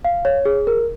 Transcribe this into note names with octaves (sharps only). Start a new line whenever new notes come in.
F5
C#5
G#4
A#4